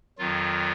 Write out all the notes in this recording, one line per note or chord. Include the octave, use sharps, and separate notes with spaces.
F2 D#3 F#3 F4